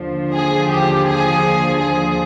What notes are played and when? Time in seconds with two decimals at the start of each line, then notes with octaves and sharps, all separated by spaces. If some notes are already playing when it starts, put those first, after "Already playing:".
Already playing: D#2 D3 F3
0.33 G#4
0.70 G4
1.07 G#4
1.81 G#4